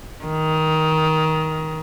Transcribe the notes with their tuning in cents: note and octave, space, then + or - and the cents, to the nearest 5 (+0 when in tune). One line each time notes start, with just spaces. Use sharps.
D#3 +15